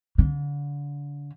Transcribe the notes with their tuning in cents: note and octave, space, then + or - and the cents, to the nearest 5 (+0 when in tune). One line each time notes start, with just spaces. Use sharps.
D3 -35